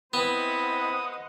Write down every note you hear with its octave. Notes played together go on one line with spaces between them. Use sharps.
B3 C4 E4 C5 D#5 F#5 B5 D#6